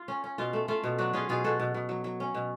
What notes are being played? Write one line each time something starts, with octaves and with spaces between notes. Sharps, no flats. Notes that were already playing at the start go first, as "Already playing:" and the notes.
Already playing: F4
C#4
C#4
B2 F4
A3
A3 F4
B2
F#3 D4 F#4
C#4 F4 G#4
B2 F4 G#4
B2 F#4 A4
B2
B2
F#3
F#3
C#4
B2